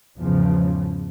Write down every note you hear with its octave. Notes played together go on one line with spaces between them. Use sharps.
E2 G#2 C#3 F3